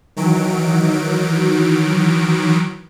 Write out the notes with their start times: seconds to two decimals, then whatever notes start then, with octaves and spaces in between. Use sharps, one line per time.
0.17 D#3 E3 F#3 D7